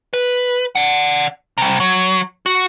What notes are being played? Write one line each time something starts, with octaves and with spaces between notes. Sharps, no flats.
B4
D5 F#5
C3 G3
F#3
F#4